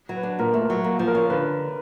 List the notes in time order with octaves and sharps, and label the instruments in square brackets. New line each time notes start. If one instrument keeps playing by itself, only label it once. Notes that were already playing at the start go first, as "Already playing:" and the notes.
[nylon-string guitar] F#3
[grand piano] B4
[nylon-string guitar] D4
[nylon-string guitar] A#2 [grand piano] A#4
[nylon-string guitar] A3
[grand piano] A#4
[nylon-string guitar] F#3
A#3
F3
[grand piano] A#4
[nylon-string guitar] C#4
[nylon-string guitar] D3 [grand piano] B4